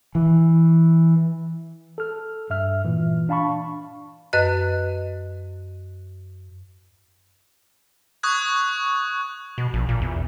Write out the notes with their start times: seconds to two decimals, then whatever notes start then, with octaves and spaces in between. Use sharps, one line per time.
0.15 E3
1.98 A4 F6
2.50 G2 E5 F6
2.85 A#2 E3
3.29 D4 F5 A5 B5 C#6
4.33 F#2 B4 D#5 F#6
8.23 C#6 D#6 F#6 G#6
9.58 B2
9.74 A#1
9.89 A#2
10.02 E2